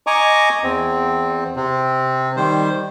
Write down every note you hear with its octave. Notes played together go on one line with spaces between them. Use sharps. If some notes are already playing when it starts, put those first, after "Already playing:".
D#5 G#5 A#5 C#6 D6
E2 C4
C3 C4
D#3 G3 C5